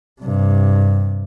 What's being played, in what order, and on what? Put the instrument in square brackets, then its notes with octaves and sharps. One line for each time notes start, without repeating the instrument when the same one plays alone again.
[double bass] G2 C3